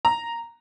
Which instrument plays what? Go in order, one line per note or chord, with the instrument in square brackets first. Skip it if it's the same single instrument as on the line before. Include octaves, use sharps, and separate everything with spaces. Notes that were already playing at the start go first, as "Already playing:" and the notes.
[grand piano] A#5